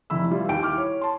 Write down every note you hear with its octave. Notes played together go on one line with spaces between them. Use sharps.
F1 E4 B5 E6
E3 G3 E4 F4
D#2 G5 D7
E4 D6 F6
C#5
A5 C6